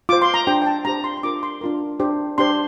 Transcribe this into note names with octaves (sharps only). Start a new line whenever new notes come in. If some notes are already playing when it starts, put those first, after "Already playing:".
F4 C5 D6
C6
A#5
D4 G4 C5 G5
G5
A5
D4 G4 C5 A#5
C6
C6
D4 F4 A#4 D6
C6
D4 F4 A#4
D4 G4 C5
D4 G4 C5 C6